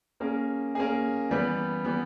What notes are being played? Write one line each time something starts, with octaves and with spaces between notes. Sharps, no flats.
A#3 C#4 G#4
A#3 C#4 G#4
E3 G3 B3
E3 G3 B3